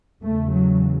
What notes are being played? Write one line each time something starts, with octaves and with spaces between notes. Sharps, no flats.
E2 C#3 A3
F#3